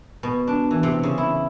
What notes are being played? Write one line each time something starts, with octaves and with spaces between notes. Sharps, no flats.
B2
D4
E3
C3
C#3
E4